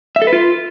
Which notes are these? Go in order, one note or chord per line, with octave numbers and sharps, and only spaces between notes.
E5
A4
B4
F4